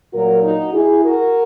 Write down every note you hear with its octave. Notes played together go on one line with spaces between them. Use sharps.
A#2 F#3 F#4 A#4
D#4 F#4
E4 G#4
F#4 A#4